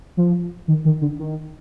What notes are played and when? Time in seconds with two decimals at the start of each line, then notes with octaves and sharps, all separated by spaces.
0.17 F3
0.68 D#3
0.85 D#3
1.01 D3
1.19 D#3